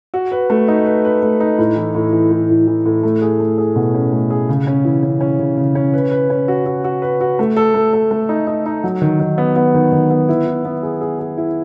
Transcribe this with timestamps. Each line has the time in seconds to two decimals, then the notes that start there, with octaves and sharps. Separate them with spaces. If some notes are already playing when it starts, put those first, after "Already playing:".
0.14 F#4
0.32 B4
0.50 A3
0.68 D#4
0.86 B4
1.05 B4
1.23 A3
1.40 D#4
1.58 A2
1.76 E3
1.95 A2
2.13 E3
2.31 A2
2.49 A2
2.68 E3
2.86 A2
3.03 A3
3.22 G#4
3.40 A3
3.58 G#4
3.76 B2
3.94 C#4
4.12 A3
4.30 G#4
4.49 C#3
4.67 C#4
4.85 E3
5.03 C#4
5.21 C#4
5.39 C#3
5.57 C#3
5.75 C#4
5.94 B4
6.11 B4
6.30 C#4
6.48 F#4
6.66 F#4
6.84 F#4
7.02 B4
7.21 F#4
7.39 A3
7.57 A4
7.74 A3
7.93 A4
8.11 A3
8.29 D#4
8.47 D#4
8.66 D#4
8.84 F#3
9.02 D#3
9.20 D#3
9.38 B3
9.56 B3
9.74 D#3
9.92 D#3
10.11 B3
10.29 E4
10.47 E4
10.65 B3
10.83 G#4
11.01 G#4
11.19 G#4
11.38 E4